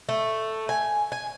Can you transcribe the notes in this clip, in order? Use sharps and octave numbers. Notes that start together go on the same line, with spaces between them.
A3
G#5
G#5